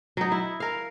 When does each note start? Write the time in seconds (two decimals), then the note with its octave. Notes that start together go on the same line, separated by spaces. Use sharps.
0.17 F#3 D#4
0.32 E4
0.60 A#4 F5